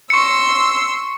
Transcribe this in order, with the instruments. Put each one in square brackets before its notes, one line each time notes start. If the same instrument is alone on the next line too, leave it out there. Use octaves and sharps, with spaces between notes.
[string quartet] C6 E6 [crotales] C#6 C#7